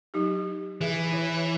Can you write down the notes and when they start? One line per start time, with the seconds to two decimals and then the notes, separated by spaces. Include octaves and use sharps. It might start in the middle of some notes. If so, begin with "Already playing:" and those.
0.14 F#3 D#4 G4
0.81 E3 G#4 E5
1.12 E4 C#5